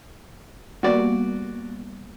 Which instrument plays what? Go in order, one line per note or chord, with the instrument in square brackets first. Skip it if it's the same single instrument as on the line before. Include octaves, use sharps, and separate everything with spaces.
[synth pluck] G3 A#3 B3 [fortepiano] F#4 D5